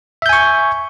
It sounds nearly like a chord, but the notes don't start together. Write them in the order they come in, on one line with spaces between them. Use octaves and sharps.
E5 G6 G#5 C#6